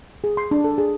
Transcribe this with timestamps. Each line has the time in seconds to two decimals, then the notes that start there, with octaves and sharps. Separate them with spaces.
0.24 G#4
0.37 C6
0.51 D4
0.64 A4
0.78 G#4